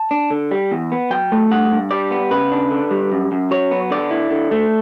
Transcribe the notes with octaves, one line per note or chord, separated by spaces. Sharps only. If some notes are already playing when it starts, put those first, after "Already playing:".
Already playing: A5
D4
D3
G3
E2
B3
F#3 G5
A3
G2 F#5
G2
G3 D5
B3
C#3 B4
D4
D3
G3
F#2
F#2
F#3 C#5
B3
D3 D5
E4
D3
A3